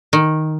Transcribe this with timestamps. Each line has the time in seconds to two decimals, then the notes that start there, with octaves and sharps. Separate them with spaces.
0.13 D#3